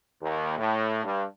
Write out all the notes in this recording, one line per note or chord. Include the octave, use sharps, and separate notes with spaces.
D#2
A2
G2